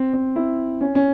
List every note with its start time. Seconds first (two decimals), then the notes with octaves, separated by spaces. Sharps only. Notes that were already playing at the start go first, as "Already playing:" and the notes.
Already playing: C4
0.13 C4
0.36 E4
0.81 C#4
0.95 C#4